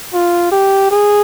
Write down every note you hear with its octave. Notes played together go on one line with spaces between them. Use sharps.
F4
G4
G#4